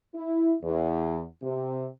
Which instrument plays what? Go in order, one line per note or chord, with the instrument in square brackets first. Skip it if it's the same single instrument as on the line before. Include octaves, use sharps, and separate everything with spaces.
[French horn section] E4
E2
C3